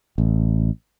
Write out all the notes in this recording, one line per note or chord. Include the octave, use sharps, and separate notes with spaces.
A1